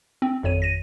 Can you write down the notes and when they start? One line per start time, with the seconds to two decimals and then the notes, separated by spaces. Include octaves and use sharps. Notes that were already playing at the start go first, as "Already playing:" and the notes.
0.22 C4
0.43 G#1 F2 C#5 D#7
0.62 A#6 D#7